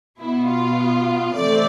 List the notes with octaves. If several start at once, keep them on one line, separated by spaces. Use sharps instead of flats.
B2 B3 E4
F4
C3 E3 A3 C4 D5